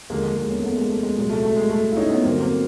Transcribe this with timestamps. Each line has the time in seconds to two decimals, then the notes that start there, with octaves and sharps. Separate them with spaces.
0.10 D#2 D3 F3 G#3 A#3
0.23 G#3 A#3
0.37 G#3
0.50 B3 C#4
0.63 A3 B3
0.76 G#3 A#3
0.89 A3
1.03 G#3
1.16 C2 A#2 F#3 G#3
1.30 A3
1.43 A3
1.56 G#3
1.70 A3
1.92 E4
1.97 C#4 D#4
2.09 B3 C#4
2.22 G2 D3 F#3 A#3 C4
2.40 A#3 C4